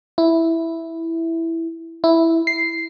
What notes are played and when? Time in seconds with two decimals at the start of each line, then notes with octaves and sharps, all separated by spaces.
0.18 E4
2.04 E4
2.47 C7